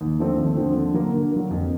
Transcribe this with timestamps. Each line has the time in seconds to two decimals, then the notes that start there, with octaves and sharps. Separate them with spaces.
0.01 D#2
0.19 D3 F3 A3 C4
0.38 D#2
0.56 D3 F3 A3 C4
0.76 D3
0.94 F#3 A#3
1.14 D3
1.32 F#3 A#3
1.51 F2